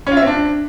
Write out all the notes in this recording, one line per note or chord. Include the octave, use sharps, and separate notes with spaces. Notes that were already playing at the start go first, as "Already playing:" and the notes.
C#4
F4
E5
C4
D4